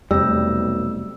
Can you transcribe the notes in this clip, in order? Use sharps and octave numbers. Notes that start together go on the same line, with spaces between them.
B1 E2 C3 G3 A3 E6